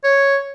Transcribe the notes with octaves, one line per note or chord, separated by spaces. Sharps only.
C#5